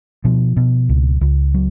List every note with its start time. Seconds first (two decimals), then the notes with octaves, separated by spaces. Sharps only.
0.24 B2 F3
0.57 B2
0.89 C#2
1.21 C#2
1.54 F#3